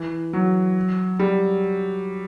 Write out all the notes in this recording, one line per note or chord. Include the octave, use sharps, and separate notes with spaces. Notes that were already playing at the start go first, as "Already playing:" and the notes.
Already playing: E3
F#3
G3